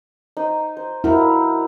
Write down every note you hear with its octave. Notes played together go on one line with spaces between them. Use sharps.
D#4 C5
C5
E4 F#4 A#4 F5